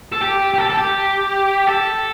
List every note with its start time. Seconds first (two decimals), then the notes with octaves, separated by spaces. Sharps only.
0.12 A4
0.21 G4
0.54 G4
0.58 A4
0.70 A4
0.76 G4
1.67 A4